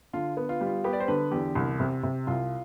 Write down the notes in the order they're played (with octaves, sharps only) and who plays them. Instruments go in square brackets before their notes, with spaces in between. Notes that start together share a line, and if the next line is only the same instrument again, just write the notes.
[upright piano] D3 [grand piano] F4
[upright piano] B3
[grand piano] F4
[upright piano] G3
[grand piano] F4
[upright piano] B3 [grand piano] G4
[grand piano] D5
C5
[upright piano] D3 [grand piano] B4
[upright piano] E2 [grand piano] G4
[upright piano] C2
C3
C3
[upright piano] C2 [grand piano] F4